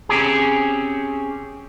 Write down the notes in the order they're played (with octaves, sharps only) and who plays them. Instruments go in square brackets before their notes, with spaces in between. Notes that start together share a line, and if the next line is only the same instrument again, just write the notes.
[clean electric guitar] C4 C#4 G4 G#4